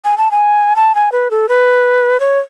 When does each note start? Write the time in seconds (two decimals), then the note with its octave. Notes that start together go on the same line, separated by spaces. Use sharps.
0.05 G#5
0.18 A5
0.31 G#5
0.76 A5
0.95 G#5
1.12 B4
1.31 A4
1.49 B4
2.20 C#5